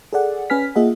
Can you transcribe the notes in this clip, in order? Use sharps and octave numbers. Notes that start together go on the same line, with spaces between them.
G#4 A4 D5 F#5
C#4 B4 G#5 F6 B6
A#3 F4 G#4 D#5 E5 F#5